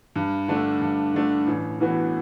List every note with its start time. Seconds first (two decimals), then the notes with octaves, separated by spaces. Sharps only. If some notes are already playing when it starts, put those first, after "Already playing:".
0.16 G2
0.48 D3 A3 D4
0.81 G2
1.14 D3 A3 D4
1.47 A1
1.80 A2 E3 B3 F#4